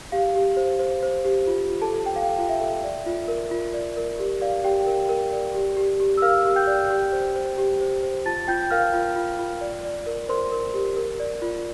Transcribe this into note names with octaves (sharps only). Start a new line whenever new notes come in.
G4 F5
G4
C5
C5
C5
G4
F4
F4
A4 A5
A4
G5
A4 F5
F4
E5
A4
D5
F4
A#4
F4
D5
A#4
G4
D5 F5
G4 G5
A#4
A#4
D5
G4
G4
G4
E6
A#4 F5 F6
G4
G5 G6
D5
G4
C5
C5
G4
C5
C5
F4 A5 A6
F4 G5 G6
A#4 F5 F6
F4
F4
F4
D5
D5
A#4
A#4 C5 C6
A#4
G4
A#4
D5
F4